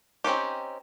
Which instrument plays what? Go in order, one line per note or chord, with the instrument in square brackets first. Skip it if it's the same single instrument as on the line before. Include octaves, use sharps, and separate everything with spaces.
[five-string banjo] C4 C#4 D#4 G4